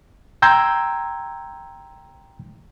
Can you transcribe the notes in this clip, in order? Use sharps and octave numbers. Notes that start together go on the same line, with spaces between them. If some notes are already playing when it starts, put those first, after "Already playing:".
G5 A#5 C6 E6 G6 G#6